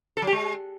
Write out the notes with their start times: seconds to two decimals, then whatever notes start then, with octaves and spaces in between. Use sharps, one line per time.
0.17 A4
0.22 F#3
0.27 G4
0.33 G#3